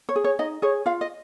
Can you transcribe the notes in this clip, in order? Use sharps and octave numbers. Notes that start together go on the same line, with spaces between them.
C#5
G#4
C#5
D#4 D#5
G#4 C#5
F4 F5
D#5